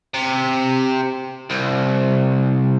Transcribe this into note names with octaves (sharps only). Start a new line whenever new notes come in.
C3
C2